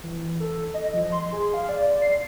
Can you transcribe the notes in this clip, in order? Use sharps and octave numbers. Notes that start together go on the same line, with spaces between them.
E3
A4
D#5
F3
C6
G#4
F5
D5
C7